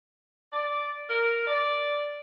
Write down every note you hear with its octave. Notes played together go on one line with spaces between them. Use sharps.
D5
A#4
D5